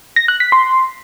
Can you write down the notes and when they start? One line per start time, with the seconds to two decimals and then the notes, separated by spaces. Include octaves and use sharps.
0.16 A#6
0.28 F#6
0.40 B6
0.52 C6